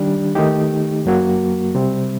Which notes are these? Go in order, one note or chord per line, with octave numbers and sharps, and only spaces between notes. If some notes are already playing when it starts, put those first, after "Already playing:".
Already playing: D#3 G3 D4 G4
D#3 A3 D#4 G4
F#2 F#3 A#3 F#4
C3 G3 C4